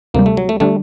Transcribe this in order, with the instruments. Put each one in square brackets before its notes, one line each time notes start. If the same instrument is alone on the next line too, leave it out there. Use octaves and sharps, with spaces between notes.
[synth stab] D2 C3 G3 [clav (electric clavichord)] A#3
[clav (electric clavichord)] A3
F#3
A3
[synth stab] D3 G3 D4 [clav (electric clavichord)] A3